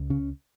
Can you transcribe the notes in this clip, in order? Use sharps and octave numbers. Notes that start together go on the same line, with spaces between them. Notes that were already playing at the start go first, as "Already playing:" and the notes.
Already playing: C#2
C#3 C#4